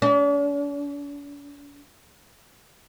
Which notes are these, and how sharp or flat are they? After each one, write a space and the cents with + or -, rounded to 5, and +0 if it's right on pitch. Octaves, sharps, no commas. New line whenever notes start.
D4 -45